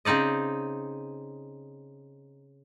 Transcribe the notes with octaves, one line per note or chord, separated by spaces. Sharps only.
C#3 C4 D#4 D5 D#5